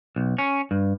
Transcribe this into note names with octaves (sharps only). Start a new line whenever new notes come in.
B1
C#4
G2